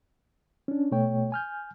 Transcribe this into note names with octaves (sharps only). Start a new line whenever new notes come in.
C#4 D4
B2 A3 C#5 G5
G#5 F6 G6